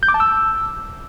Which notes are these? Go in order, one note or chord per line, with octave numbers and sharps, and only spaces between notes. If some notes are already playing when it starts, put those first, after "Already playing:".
G6
D6
A5
E6